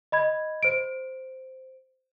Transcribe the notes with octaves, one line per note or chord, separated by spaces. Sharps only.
D#5 B5 G#6
C5 D7